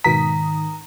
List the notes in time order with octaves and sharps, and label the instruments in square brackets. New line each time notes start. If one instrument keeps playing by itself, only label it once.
[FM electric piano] G#2 D#3 D#6 [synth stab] B2 B6 [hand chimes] A#5